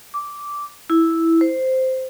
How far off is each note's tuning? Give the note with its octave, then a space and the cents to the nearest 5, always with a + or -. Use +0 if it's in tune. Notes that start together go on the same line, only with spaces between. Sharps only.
D6 -10
E4 -5
C5 -5